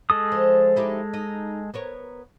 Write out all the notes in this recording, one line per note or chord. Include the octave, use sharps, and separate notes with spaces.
G#3 A4 D#6
F3
D#4 E4 G4
D#4
B3 A#4 C#5